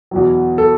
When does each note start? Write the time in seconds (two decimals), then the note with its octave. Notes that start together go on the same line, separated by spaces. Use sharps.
0.11 E2 B2 F#3
0.58 A4